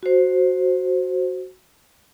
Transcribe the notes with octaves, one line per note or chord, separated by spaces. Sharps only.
F#4 C5